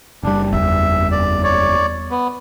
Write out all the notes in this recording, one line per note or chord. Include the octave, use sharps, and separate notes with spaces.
F#1 G3 D4
E2 E5
D5
C#5 D5
B3